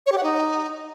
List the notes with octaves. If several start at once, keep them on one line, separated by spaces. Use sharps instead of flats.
C#5
G4
F#5
D#4